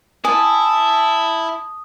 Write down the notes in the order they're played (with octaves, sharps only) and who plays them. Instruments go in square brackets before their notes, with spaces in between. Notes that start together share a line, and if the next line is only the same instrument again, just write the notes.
[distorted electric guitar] E4 [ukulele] G#5 [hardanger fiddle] A5 [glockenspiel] D#6